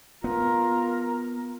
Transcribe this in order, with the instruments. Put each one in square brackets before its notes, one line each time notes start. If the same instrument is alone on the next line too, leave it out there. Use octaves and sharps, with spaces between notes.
[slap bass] B3 [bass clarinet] F4 [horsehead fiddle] A#4